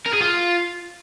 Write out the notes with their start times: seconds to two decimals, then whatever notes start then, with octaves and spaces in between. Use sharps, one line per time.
0.06 A#4
0.13 G#4
0.21 F4